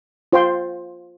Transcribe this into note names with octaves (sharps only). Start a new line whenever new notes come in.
F4 C5 G5 C6